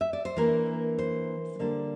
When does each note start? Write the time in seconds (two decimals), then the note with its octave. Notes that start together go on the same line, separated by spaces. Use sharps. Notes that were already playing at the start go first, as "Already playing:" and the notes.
0.01 E5
0.13 D5
0.25 C5
0.37 E3 A#3 D4 A#4
0.99 C5
1.59 D3 G3 A#3 D4